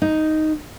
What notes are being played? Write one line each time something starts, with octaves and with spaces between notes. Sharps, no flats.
D#4